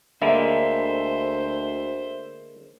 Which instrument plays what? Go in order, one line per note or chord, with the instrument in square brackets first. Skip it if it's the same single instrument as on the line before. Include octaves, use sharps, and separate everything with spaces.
[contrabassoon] D2 [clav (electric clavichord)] D3 G#3 A#3 [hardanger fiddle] C5 [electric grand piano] E5 B5